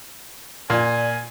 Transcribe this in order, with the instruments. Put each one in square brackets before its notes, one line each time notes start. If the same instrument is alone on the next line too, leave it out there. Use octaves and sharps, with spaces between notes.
[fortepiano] A#2 [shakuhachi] D5 [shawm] G#5